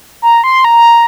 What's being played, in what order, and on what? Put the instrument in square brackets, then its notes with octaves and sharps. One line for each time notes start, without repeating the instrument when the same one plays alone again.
[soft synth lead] A#5
C6
A#5